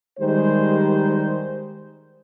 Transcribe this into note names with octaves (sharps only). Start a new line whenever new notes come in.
D#3 G3 G#3 G4 C5